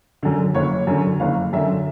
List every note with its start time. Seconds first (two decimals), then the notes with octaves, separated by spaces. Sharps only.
0.23 F#2 D3
0.54 F#1 C#5
0.87 F#2 D3
1.20 F#1 F5
1.53 F#2 D3 E5